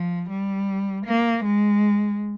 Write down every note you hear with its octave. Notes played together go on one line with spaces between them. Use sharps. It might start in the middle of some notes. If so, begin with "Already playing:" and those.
Already playing: F3
G3
A#3
G#3